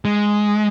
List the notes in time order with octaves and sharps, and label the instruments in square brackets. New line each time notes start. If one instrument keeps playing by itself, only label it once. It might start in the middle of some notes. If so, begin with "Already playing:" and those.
[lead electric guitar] G#3